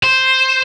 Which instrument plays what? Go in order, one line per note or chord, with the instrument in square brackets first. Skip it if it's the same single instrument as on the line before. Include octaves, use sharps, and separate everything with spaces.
[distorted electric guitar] C5